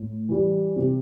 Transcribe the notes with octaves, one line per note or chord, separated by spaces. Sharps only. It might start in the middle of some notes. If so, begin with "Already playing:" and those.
Already playing: A2
E3 G3
C3